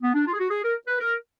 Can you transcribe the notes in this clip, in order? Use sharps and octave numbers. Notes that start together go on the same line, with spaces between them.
B3
D4
F4
G#4
F#4
G#4
A#4
B4
A#4